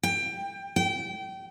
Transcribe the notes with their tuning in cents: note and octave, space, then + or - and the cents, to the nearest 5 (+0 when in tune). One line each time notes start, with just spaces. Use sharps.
G5 +20
G5 -25